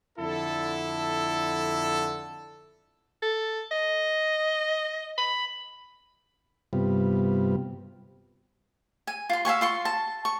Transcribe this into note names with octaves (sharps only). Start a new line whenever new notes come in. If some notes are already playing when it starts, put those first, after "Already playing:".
F2 D3 E4 A4
A4
D#5
B5
G2 C3 G3 B3 F4
G#5
F4 C6
E5 F5 G#5 C#6
F4 C6 C#6
A5
C#6